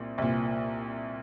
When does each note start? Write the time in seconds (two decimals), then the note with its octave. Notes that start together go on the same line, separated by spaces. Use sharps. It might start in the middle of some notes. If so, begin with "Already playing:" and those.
Already playing: C2 A#2
0.18 C2 A#2